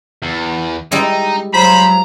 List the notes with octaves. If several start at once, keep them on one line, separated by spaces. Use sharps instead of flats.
E2
G3 G#3 D#4 E4
F3 F#3 C5 A#5 B5